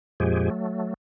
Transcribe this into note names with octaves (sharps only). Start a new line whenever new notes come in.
F2 A#2 F3 G#3 G4 G#4
F#3 A3